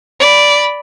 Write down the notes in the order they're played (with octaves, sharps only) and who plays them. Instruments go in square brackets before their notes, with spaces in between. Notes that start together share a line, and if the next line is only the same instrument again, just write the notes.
[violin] D5 B5